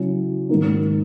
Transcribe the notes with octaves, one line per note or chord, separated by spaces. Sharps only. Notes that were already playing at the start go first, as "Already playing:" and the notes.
Already playing: C#3 F#3 C#4 E4
G#2 D#3 A#3 D#4